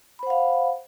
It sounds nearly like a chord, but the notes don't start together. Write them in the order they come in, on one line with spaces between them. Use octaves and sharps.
B5 C5 F#5 F5